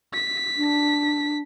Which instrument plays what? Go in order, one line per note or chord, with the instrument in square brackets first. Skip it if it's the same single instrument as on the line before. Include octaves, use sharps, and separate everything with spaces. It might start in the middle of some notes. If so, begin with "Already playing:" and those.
[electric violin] B6
[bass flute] D4